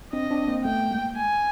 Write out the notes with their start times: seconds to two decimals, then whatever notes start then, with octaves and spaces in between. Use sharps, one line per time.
0.13 C4 D4 D#5
0.30 C4 D4
0.48 A#3 C4
0.65 A3 B3 G5
0.91 G#3 A#3
1.17 G#5